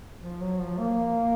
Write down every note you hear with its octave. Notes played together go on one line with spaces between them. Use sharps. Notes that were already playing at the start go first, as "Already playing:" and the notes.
F3
F#3
F3
A#3